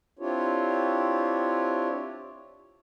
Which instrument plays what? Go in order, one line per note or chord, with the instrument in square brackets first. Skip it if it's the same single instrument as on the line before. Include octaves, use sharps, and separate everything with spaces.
[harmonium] C4 D4 E4 F4 G4 C#5